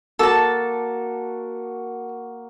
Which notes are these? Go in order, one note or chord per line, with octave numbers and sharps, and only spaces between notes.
A#3 F#4 A4 A5